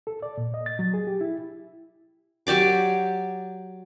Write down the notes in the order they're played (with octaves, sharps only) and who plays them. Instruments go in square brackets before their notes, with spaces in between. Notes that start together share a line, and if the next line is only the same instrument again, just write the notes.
[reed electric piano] A4
D5
A#2
D#5
A6
F#3
G#4
G4
E4
[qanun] F#3 G4 D5 D6